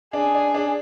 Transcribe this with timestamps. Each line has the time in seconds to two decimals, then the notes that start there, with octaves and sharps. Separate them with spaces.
0.13 D4 G#4
0.34 D4
0.54 D4